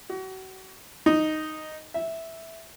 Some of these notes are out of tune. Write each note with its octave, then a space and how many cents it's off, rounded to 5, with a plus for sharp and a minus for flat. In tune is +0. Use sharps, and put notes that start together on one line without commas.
F#4 +35
D#4 -5
E5 -5